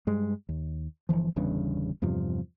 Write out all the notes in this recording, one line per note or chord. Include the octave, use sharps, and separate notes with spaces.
G2 G#3
D#2
G1 C#3 E3 F3
G1 E2 G2 C#3
E2 G2 C3 F3